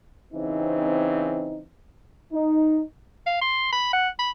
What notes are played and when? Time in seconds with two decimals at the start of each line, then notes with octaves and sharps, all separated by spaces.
0.33 C#3 E3 C4 D#4
2.33 D#4
3.26 F5
3.41 C6
3.73 B5
3.93 F#5
4.19 B5